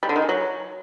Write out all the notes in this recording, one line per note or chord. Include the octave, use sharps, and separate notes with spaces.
G3
D3
D#3
G#3
F#3